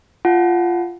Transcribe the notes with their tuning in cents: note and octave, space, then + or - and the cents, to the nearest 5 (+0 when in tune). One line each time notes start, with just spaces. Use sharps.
F4 -10 F#5 +0 A5 -25